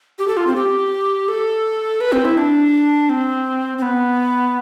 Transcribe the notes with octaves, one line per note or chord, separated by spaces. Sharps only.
G4
A4
F4
C4
G4
A4
B4
C4
E4
D4
C4
C4
B3